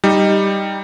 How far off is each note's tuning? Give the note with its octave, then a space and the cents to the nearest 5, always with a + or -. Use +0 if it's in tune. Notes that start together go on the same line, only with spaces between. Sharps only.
G3 +5 D#4 +0